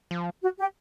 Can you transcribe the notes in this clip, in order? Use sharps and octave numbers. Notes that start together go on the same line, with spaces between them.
F3
F#4
G4